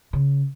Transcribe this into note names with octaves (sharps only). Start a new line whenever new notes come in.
C#3